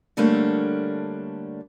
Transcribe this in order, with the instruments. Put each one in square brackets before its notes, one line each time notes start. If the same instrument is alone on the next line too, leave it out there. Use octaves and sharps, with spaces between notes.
[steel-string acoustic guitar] D3 G3 A3 A#3 C#4 D4